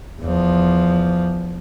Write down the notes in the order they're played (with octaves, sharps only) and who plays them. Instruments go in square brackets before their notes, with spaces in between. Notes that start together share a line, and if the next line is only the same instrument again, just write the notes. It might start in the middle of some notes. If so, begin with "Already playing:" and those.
[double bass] E2 F3